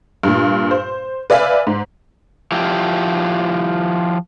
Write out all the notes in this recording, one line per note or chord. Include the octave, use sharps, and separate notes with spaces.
G2 A#2
C5
B4 D5 E5 F5 G#5
G#2
F3 E4 G4